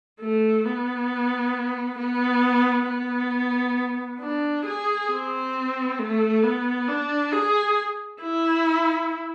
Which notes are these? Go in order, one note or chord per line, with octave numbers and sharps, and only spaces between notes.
A3
B3
B3
B3
D4
G#4
C4
A3
B3
D4
G#4
E4